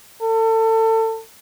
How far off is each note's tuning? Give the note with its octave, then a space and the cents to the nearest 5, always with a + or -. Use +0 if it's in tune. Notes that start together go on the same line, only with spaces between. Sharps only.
A4 +30